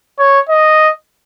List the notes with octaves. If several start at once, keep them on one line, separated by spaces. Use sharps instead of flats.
C#5
D#5